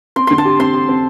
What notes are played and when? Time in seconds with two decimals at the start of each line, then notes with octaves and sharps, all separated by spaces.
0.16 C4 C6
0.27 D3 C6
0.38 A5
0.45 G4
0.59 C4 C6
0.74 G4
0.89 C4